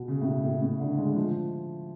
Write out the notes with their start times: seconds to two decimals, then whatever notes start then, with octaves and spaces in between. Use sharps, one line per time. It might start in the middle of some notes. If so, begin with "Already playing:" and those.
Already playing: B2
0.08 C#3
0.21 A2
0.25 B2
0.44 A2
0.62 A2
0.80 D3
0.98 G#3
1.15 F3